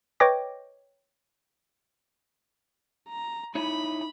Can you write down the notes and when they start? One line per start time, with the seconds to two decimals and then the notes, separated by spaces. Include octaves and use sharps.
0.20 B4 C#5 D#5 G5 D6 A#6
3.08 A#5
3.55 D#4 E4 C#5 B5